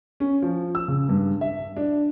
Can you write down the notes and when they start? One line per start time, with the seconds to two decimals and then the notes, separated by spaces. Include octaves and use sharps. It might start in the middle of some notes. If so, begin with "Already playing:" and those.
0.20 C#4
0.42 F3
0.75 E6
0.88 C#3
1.09 G2
1.41 E5
1.77 D4